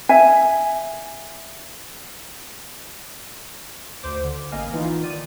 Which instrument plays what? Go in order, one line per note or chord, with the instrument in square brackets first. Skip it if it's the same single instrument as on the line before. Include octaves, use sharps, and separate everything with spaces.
[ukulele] E5 G#5
[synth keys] D2 C5 D6
D3
A1 A#3 D#5 F5 G#5 F6
E3 B3 D#4 F4
D#3 D5 D#7